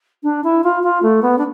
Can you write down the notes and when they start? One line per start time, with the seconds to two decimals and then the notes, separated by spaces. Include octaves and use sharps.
0.23 D4
0.44 E4
0.64 F4
0.83 F4
1.02 A3
1.22 B3
1.38 D4